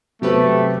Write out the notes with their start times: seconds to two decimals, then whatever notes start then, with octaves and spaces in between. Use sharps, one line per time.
0.22 C3 F#3 A3 C4 G4 B4